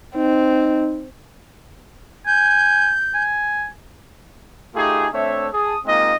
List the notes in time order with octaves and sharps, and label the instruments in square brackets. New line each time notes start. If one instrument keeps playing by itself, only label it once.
[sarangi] C4 [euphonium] D#4
[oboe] G#5 [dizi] G6
[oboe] G#5
[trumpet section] A3 D#4 F4 G4 G#4
A3 C4 D4 C#5 E5
G#4 A5 D#6
G#3 A#3 C4 D#4 F4 D#5